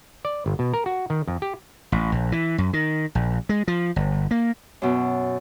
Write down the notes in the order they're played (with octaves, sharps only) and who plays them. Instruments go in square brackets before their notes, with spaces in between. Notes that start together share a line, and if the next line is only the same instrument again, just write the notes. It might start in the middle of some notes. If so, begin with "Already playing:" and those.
[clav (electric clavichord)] D5
G1
B2
A#4
F#4
D#3
F2
G4
[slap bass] A1
A#1
E3
F#2
D#3
A#1
G#3
F3
G1
A#3
[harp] F#2 B2